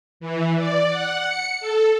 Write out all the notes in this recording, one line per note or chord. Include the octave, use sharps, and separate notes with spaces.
E3
D5
F#5
C#7
A4